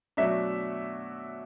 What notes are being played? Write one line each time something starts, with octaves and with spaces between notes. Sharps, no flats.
B2 F#3 A3 D4 E5